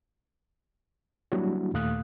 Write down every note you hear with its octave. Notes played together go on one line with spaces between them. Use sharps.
F#3 G3 A#3 D4 E4 F#4
D#2 A#2 A3 F5 D#6 F#6